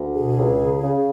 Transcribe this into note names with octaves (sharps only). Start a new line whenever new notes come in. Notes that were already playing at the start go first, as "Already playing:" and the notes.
Already playing: D2
B2 G#4
C#2
C#3
C#3